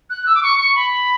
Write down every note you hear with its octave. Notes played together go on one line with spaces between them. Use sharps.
F#6
E6
D6
C#6
C#6
B5